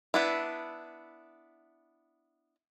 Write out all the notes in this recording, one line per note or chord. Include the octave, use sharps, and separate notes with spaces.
B3 D4 E4